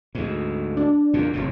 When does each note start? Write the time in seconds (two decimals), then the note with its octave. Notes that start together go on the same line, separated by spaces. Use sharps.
0.15 D2 G#2
0.77 D4
1.14 E2 A#2
1.33 F1 E2 A2